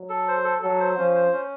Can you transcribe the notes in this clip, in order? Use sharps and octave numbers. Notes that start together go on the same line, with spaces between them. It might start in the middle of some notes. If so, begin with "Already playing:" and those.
Already playing: F#3
A4
C5
A4
F#3 A4
C5
F3 C#4
C5
C#4